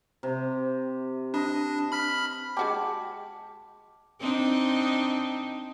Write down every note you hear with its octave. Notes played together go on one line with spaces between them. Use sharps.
C3
D4 B4 D#5
B5 F6 B6
G#3 F#4 G4 A5 D6
C4 D4 D#4